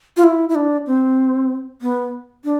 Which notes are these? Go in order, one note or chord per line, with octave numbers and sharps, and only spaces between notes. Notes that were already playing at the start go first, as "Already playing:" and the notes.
F4
E4
E4
D4
C4
B3
D4